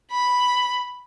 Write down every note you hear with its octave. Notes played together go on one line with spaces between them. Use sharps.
B5